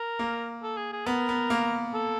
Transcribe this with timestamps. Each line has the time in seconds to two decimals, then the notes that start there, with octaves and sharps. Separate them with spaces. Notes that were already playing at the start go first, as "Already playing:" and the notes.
Already playing: A#4
0.19 A#3
0.63 A4
0.77 G#4
0.92 G#4
1.06 B3 A#4
1.29 B3
1.50 A#3
1.94 A4